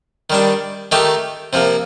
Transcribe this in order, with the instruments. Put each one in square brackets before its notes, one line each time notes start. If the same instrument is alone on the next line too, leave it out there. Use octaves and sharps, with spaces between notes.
[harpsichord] D#3 G3 D4
D#3 A3 D#4 G4
C3 F3 A#3